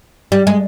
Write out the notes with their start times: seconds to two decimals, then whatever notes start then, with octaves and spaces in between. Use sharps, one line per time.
0.32 G3
0.47 G#3